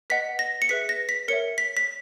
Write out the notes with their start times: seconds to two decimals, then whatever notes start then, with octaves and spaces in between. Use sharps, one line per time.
0.10 B4 D#5 F#5 B6
0.39 A#6
0.62 C#7
0.69 G#4 B4 E5 B6
0.89 A#6
1.09 B6
1.28 A#4 C#5 E5 C#7
1.58 B6
1.77 B6